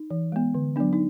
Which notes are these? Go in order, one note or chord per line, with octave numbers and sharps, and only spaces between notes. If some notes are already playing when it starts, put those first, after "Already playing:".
Already playing: D#4
E3
G#3 B3
D3
F#3 B3 D4
D#4